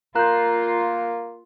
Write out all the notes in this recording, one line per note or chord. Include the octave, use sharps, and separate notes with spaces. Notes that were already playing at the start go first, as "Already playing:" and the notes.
A#3 F4 A#4 A#5 F#6 G6